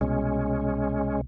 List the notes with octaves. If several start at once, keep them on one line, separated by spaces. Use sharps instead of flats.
C2 B2 G#3 C#4